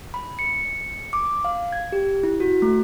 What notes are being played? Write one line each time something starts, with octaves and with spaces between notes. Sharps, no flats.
B5
C#7
D6
F5
G#6
G4
E4
F#4
A3